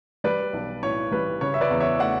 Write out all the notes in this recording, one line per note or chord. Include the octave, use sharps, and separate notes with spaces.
G3 B4 D5
B1
A2 C#5
G3 B4
C#3 C#5
E5
B4 D5
E2
C#5 E5
A3 D5 F#5